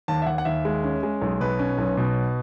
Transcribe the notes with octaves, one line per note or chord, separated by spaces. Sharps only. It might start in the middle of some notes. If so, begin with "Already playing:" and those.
D#2 A5
E5
D#2 F#5
F#5
D#2 E5
G#3
C#4
G#3
B1
B2 B4
C#4
B1
B2